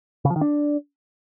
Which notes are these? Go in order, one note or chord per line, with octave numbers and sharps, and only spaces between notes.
C#3
F3
D#3
D4